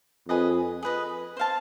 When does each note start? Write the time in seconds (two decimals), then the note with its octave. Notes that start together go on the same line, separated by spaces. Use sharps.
0.29 F2 G#4 B4 D#5
0.83 G#4 B4 D#5
1.37 C5 F5 A5